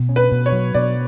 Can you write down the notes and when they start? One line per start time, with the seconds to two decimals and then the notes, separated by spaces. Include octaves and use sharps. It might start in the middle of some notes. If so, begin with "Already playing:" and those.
Already playing: B2
0.09 C#4
0.16 B4
0.32 B2
0.46 C#5
0.52 F#3
0.74 B2 D5